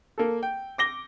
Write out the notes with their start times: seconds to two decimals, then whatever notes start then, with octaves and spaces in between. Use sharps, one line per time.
0.18 A#3 A4
0.43 G5
0.78 D6 A#6 G7